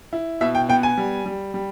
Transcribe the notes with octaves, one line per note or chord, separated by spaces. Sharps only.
E4
B2 E5
G5
B3 G5
G#5
G3
G3
G3